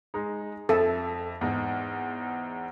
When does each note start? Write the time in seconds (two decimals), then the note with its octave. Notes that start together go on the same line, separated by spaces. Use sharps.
0.14 G#3 D#4
0.69 F2 A4 E5
1.41 E2 G#2 D#4